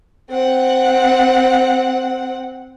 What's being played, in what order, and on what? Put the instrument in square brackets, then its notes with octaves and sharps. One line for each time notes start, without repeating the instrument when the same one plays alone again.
[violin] C4 F#5